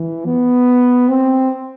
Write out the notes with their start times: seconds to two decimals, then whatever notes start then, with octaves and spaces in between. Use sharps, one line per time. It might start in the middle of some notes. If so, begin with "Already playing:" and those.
Already playing: E3
0.26 B3
1.09 C4